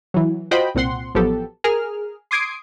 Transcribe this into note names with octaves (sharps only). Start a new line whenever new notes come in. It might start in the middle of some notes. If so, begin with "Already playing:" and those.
E3 F#3
F4 F#4 C5 D#5 G5 B5
C2 A#2 C4 F#5 C6
A1 F3 F#3 B3 G4 A4
G#4 A#4 F6
C6 D6 D#6 G#6 C7 D7